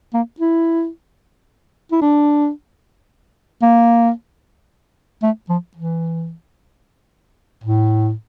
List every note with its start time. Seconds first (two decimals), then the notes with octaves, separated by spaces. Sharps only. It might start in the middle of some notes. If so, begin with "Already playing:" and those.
0.14 A#3
0.40 E4
1.92 E4
2.01 D4
3.62 A#3
5.22 A3
5.49 F3
5.76 E3
7.64 A2